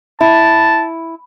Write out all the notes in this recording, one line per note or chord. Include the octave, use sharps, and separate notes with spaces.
E4 A5